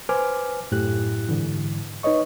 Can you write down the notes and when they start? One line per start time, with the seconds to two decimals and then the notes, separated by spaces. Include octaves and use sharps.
0.09 B4 C5 G#5 D6 F6
0.71 F#2 A2 E4 G4 F#6
1.29 G#2 D3 E3
2.03 D#4 B4 C#5 D#5 C#6